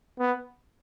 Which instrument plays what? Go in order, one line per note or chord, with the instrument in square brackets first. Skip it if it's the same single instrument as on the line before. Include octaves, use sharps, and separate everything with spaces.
[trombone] B3